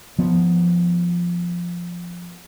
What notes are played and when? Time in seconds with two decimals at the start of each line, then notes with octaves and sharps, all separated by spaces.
0.19 F3 B3